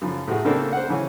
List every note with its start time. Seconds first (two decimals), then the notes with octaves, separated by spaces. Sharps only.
0.01 F#2 C#3 F3
0.28 A2 A3 F#4 G#4
0.45 C#3 A3 A#3 C4 D4 A4
0.73 C5 F#5
0.89 C#3 E3 C#4